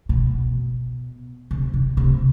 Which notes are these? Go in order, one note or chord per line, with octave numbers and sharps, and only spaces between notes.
B2
C3
D3
C3